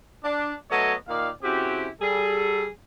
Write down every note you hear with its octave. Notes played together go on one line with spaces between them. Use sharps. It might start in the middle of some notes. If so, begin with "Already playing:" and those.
D4
F#3 A3 B3 A4 C#5 D#5
A#2 D#3 D5 F5
C#3 C4 E4 F#4 G4
G3 G#4 A4